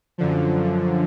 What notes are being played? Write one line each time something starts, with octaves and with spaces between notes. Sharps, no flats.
F#2 D3 F3